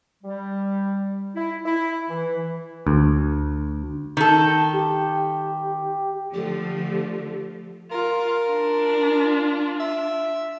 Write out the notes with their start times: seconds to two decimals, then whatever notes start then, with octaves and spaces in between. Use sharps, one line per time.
0.23 G3
1.36 E4
1.65 E4
2.09 E3
2.87 D2
4.17 D#3 A4 G6
4.73 G4
6.34 D3 F3 A3 G4
7.91 F4 A#4
8.51 D4 F4
9.80 E5